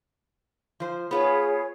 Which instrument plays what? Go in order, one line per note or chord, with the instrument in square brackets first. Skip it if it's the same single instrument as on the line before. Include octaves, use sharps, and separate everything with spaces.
[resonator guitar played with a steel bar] F3 C5
[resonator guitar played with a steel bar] B3 F4 B4 [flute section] G#4 C#5